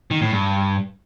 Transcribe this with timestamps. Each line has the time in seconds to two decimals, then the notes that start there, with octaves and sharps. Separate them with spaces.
0.11 D#3
0.21 A2
0.31 G2